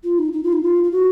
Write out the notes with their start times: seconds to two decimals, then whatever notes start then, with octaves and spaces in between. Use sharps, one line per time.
0.03 F4
0.18 D#4
0.32 D#4
0.43 F4
0.52 D#4
0.62 F4
0.83 F4
0.91 F#4